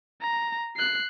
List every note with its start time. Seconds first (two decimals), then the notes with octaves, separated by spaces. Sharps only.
0.22 A#5
0.77 F#6 C7